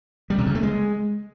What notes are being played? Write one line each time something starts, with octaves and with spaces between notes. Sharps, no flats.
G3
C3
C#3
A3
G#3